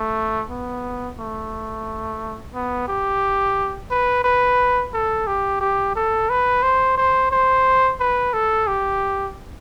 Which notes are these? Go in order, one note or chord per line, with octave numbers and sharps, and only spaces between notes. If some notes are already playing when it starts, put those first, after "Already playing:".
Already playing: A3
B3
A3
B3
G4
B4
B4
A4
G4
G4
A4
B4
C5
C5
C5
B4
A4
G4